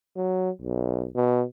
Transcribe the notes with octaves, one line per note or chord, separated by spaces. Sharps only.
F#3
B1
B2